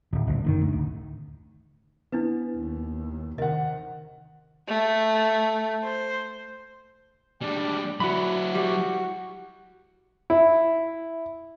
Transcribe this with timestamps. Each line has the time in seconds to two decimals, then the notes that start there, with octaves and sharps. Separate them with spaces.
0.13 D1
0.27 D#1 D2
0.45 F#1 D3 D#3
0.61 D2
0.73 D1
2.12 B3 D4 E4 B4
2.56 D#2
3.38 C3 D#3 A#4 D#5 F#5
4.68 A3
5.83 C5
7.41 G3 G#3 D4
8.00 F#3 E4 F#4 F#5 B5
8.55 G3 F#4
10.30 E4